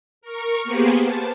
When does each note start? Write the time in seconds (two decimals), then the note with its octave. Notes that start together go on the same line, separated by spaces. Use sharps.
0.21 A#4 C#6
0.64 A#3 B3 G4 G#4 B4 C5
1.02 A5